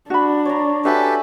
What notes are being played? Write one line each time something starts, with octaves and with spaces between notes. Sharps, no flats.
D4 F#4 B5
C#5 D5 A#5
D4 F#4 G4 A4 B4 E5 G#5